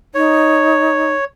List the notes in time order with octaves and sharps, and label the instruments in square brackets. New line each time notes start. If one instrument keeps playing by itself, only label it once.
[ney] D#4 [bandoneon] C#5